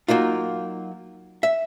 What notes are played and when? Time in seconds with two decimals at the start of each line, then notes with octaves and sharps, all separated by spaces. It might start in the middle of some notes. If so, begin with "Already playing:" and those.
0.08 F#3 A#3 D#4 F4
1.43 E5